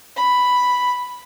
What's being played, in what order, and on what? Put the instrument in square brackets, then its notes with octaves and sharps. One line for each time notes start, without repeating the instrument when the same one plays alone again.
[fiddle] B5